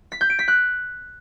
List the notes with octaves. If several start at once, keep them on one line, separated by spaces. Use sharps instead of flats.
B6
G6
D7
B6
F#6